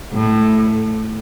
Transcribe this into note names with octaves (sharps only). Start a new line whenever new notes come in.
A2